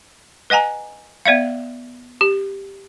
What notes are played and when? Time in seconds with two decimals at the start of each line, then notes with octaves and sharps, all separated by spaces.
0.50 B4 D#5 F#5 G#5 A#5
1.26 B3 D5 E5 F5
2.21 G4